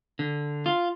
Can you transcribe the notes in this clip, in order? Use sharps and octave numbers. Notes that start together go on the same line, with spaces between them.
D3
F4